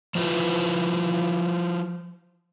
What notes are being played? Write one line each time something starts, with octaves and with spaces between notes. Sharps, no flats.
F3 F#3 E4 F4 B4 C5